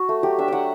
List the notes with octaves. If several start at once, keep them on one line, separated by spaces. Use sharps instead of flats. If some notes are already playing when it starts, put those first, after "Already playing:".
Already playing: F#4
A3
F#3 G4
D4 E5
F#3 F#5 G5